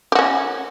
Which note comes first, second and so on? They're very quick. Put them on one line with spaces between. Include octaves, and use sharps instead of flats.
G4 F#4 C#4